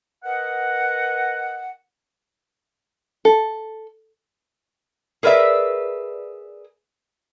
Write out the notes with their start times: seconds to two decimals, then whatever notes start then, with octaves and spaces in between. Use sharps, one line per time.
0.24 A#4 B4 D#5 F#5
3.25 A4
5.23 G#4 A#4 B4 D5 E5